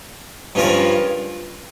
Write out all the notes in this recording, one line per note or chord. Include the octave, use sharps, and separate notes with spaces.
G2 F3 C#4 F4 A#4